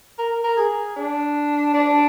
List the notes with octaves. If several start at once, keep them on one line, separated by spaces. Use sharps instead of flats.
A#4
A#4
G#4
D4
D4